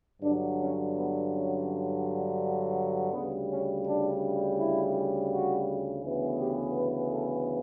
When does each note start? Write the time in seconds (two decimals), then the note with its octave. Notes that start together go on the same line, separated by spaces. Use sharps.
0.21 G2 D3 F#3 D4
0.59 C#4
0.94 B3
1.31 C#4
3.13 D2 C#3 G3 B3
3.49 C#4
3.85 D4
4.58 E4
5.31 F#4
6.03 D2 C#3 E3 B3
6.39 G4
6.76 B4
7.12 A4